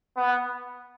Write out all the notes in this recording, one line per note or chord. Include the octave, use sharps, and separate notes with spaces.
B3